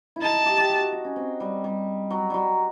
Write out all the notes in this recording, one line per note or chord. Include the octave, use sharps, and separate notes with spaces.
E4
D#4 A5
G4
G4
F#4
F#4
F#4
C#4
C4
G3
G3
F#3
F#3 G3